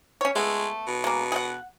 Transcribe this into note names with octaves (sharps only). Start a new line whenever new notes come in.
C#4 C#5
G#3 A3 B3
B2
G#3 A#3
G#4 F#5